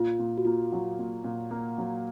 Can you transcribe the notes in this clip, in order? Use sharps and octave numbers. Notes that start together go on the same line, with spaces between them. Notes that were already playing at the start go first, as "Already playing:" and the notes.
Already playing: A#2 F4
A#2
F#4
A#3 F4
F#3
A#2
A#2
A#3
F#3